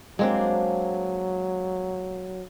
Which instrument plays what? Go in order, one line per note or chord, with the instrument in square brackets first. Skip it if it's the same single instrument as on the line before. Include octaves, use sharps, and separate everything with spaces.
[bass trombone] F#3 [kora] G#3 [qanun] A#3 C4 D4